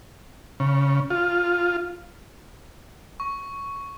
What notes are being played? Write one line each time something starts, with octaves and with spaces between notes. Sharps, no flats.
C#3
F4
C#6